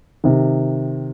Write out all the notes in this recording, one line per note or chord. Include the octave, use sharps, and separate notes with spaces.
C3 D#3